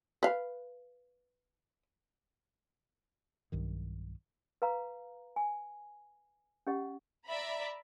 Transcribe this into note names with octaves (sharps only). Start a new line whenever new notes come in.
B4 F5
B1 G2 D#3
B4 F5 A#5
G#5
C#4 G4 D#5 F#5
D5 E5 A#5 B5